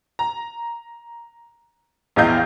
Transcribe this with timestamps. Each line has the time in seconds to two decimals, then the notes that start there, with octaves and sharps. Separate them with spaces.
0.19 A#5
2.16 A#1 E2 E4 D#5 F5 G6